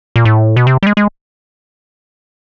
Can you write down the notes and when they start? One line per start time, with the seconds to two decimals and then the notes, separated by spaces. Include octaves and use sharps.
0.16 A#2
0.25 A2
0.56 B2
0.67 C3
0.83 G3
0.87 G#3
0.97 G#3